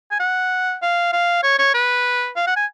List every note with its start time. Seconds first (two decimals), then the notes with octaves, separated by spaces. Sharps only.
0.11 G#5
0.20 F#5
0.82 F5
1.13 F5
1.43 C#5
1.59 C#5
1.74 B4
2.36 F5
2.47 F#5
2.56 G#5